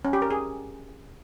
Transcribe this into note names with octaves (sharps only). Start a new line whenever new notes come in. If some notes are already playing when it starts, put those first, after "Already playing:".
C#4
G4
A#4
G#4